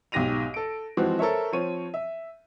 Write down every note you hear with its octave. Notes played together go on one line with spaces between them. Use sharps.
B1 G#2 G4 A#6 D#7 F7
A4 D7
E3 F3 G#3 C4 F#4
A4 A#4 C5 C#5 E5
F3 C4 C#5 D#7
E5